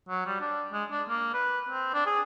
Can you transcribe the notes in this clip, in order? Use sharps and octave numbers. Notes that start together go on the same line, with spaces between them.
F#3
G3
D4
G#3
D4
A#3
B4
C4
D4
G#4